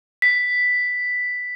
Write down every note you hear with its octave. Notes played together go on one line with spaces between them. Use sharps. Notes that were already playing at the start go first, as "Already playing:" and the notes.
B6